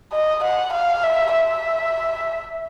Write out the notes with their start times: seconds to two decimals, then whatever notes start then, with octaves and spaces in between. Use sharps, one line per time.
0.13 D#5
0.44 F#5
0.73 F5
1.03 E5
1.34 E5